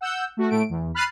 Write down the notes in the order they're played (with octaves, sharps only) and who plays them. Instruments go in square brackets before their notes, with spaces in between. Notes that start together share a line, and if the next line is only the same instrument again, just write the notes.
[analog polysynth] F#5 E6 G6
A3 F#4
A2 A3 D7
E2
B5 F6 F#6 A6 C7 D#7